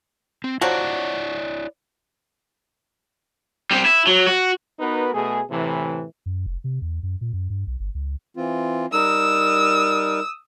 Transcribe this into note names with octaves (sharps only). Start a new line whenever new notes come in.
C4
F3 F#3 E4 F#4 C#5 D5
G3 C4
E4
F#3
F#4
B3 D#4 F#4 A#4 B4
B2 A3 G#4
A2 C3 E3
F#2
F1
C3
E2
F#2
A#2
F#2
G2
B1
G1
C#2
E3 C4 F4
G3 D#4 A#4 D#6 E6